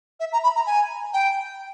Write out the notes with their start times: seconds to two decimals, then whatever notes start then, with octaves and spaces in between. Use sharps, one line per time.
0.20 E5
0.33 A#5
0.43 B5
0.56 A#5
0.66 G#5
1.13 G5